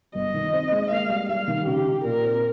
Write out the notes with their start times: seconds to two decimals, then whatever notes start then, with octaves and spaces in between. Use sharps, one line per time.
0.15 G1 D#5
0.34 D#3
0.53 C4
0.72 G#3
0.90 A#3 F5
1.09 G3
1.29 G3 F5
1.48 D#3
1.67 C#3 G4
1.86 D#4
2.05 A#2 A#4
2.24 C4